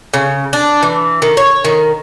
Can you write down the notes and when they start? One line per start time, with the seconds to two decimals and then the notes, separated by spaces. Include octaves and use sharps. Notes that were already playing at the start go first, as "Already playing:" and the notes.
0.14 C#3
0.53 D4
0.83 E3
1.22 D#3
1.37 C#5
1.64 D#3